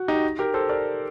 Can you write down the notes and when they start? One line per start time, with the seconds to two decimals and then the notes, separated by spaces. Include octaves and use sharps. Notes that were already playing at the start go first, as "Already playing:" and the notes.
Already playing: F#4
0.08 D#4 G4
0.39 G4 A#4
0.54 A4 C5
0.69 A#4 D5